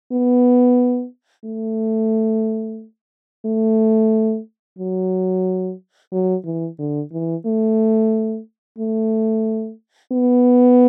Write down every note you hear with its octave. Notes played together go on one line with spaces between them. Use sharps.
B3
A3
A3
F#3
F#3
E3
D3
E3
A3
A3
B3